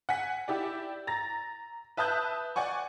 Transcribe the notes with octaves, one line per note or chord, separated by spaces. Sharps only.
F#5 G#5 B6
E4 G4 D5
A#5 A6 A#6
B4 E5 A5 D#6 F#6 G6
D5 F#5 G#5 C#6